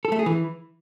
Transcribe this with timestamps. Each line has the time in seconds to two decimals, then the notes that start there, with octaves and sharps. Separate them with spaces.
0.05 A4
0.12 A3
0.19 G#4
0.26 E3